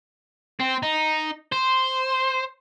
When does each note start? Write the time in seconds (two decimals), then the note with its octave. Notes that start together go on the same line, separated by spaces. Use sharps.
0.60 C4
0.83 D#4
1.52 C5